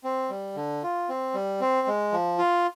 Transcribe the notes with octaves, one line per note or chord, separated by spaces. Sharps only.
C4
G3
D3
F4
C4
G3
C4
G#3
F3
F4